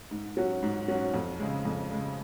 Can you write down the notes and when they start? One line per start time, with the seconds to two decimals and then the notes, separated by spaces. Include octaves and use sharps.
0.11 G#2
0.37 F#3 C#4 F#4
0.63 G#2
0.88 F#3 C#4 F#4
1.14 F2
1.40 C#3 G#3
1.65 F2
1.91 C#3 G#3